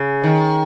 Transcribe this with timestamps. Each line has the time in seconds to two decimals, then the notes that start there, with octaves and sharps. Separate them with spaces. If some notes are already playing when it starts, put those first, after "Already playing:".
Already playing: C#3
0.24 D#3